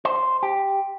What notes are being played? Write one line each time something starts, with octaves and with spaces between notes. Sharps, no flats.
C5
G4